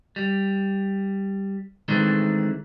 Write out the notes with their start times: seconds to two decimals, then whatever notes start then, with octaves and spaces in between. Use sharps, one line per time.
0.16 G3
1.88 D#3 E3 G#3 A3 C4 D4